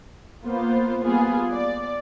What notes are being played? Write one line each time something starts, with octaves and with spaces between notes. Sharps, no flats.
A#3 B3 F4 C5
G3 A#3 B3 F4 G#4
D5